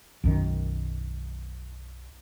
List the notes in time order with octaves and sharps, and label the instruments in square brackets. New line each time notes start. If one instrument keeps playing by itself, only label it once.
[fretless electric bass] B1 F#2 D#3